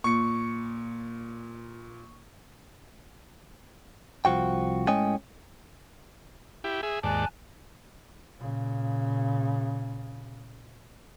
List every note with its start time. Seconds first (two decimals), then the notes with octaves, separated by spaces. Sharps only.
0.04 A#2 C#6 C#7
4.25 C2 F3 F#4 G5
4.88 A2 G#3 C#4 D#5 G5 G#5
6.64 E4 G4
6.83 G#4 E5
7.03 D#2 G#2 D5 G#5 A5 F#6
8.39 A#2 C#3